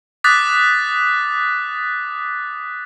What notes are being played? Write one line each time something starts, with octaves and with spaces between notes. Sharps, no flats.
D6 D#6 F#6 A6 B6